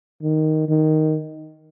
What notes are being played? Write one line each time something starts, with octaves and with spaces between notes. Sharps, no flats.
D#3
D#3